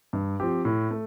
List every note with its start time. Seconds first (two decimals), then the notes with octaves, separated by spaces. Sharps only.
0.13 G2
0.40 F3 C4 G4
0.65 A2
0.91 A3